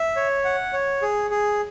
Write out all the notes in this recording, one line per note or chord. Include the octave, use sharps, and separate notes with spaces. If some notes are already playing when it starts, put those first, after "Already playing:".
Already playing: E5
C#5
F#5
C#5
G#4
G#4